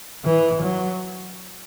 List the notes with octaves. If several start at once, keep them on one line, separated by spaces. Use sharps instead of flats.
E3
F#3